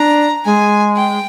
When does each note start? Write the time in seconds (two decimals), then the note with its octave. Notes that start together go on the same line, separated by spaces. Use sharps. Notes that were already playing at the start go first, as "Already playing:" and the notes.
Already playing: D4 A#5
0.45 G#3 G#5
0.96 G5